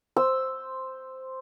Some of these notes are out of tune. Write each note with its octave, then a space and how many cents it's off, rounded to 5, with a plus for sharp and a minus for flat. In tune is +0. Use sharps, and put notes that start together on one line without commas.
C5 +0 E6 +0